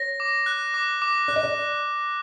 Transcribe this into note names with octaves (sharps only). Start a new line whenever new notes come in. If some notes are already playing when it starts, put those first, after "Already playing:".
Already playing: C#5 A#6
D6
F#6
D6
D6
D5 F#6
D#5
D5